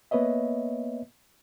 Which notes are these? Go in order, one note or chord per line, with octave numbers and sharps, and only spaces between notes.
A#3 B3 B4 C#5 D#5 E5